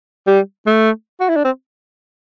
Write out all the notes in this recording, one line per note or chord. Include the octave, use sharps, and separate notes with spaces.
G3
A3
F#4
E4
D4
C4